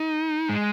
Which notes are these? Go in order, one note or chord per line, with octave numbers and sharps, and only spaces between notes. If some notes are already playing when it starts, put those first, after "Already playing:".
Already playing: D#4
G#3